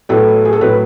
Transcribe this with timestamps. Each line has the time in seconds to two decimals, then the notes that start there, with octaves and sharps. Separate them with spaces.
0.09 A2 F#3 B3 A4
0.45 G#4
0.53 A4
0.61 A2 F#3 B3 B4